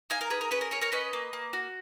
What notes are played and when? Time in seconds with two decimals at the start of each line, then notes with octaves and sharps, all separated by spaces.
0.10 D#4 F5 G#5
0.21 A#4
0.30 G#4 B4
0.41 A#4
0.51 C#4 B4
0.61 A#4
0.71 G#4 A#4 C#5
0.81 A#4 C#5
0.92 C#4 B4 D#5
1.13 A#3
1.33 A#3
1.53 F#4